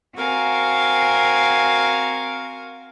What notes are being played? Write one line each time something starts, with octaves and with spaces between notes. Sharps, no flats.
C4 F#4 A#4 F5 G#5